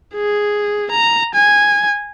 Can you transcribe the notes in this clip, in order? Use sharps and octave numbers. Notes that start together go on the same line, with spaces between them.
G#4
A#5
G#5